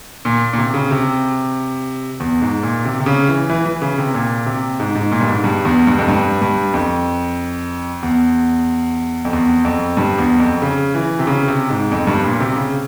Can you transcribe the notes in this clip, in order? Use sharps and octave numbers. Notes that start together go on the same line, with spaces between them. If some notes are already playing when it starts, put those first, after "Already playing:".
A#2
A#2
C3
C#3
C3
E2
G#2
A#2
C3
C3
C#3
E3
E3
E3
C#3
C3
A#2
C3
G#2
G#2
A#2
G2
G#2
G2
E2
G2
F2
G2
G2
F2
E2
F2
E2
F2
G2
E2
F2
C#3
E3
C3
C#3
C3
G#2
F2
G2
A#2
C3
C#3